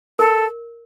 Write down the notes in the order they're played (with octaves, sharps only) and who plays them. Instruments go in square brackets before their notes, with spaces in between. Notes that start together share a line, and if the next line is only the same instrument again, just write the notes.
[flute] A4 [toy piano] A#4